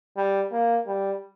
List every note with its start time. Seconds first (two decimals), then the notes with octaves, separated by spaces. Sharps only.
0.17 G3
0.52 A#3
0.87 G3